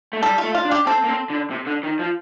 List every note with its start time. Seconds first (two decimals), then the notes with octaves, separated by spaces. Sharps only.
0.13 A3
0.23 G3 A4
0.38 F4
0.43 A3
0.55 F4
0.65 D4
0.71 G4
0.87 C4 A4
1.04 A#3
1.09 C4
1.30 D3
1.50 C3
1.66 D3
1.83 D#3
1.99 F3